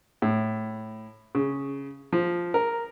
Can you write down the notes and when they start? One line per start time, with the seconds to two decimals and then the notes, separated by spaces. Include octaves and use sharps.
0.22 A2
1.35 C#3
2.12 F3
2.54 A#4